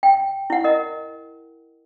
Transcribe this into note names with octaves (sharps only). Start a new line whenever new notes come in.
G5
E4 F#5
A#4 D#5